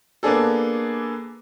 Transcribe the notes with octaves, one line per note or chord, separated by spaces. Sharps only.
A#3 B3 D4 G#4 A4